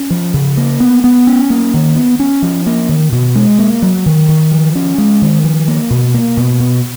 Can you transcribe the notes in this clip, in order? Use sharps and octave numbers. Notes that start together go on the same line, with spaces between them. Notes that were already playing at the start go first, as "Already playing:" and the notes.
Already playing: C#4
F3
C#3
A#3
B3
B3
C#4
A#3
D#3
B3
C#4
F3
A#3
D#3
B2
G#3
A#3
F#3
D#3
D#3
F3
C#4
G#3
D#3
F3
A#3
B2
A#3
B2
B2